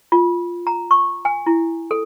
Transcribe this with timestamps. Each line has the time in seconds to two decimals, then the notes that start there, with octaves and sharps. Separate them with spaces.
0.12 F4
0.67 A#5
0.91 C#6
1.25 G#5
1.46 E4
1.91 A4